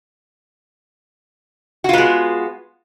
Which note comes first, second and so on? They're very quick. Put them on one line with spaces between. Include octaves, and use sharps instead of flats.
F#4 F4 B3 G#3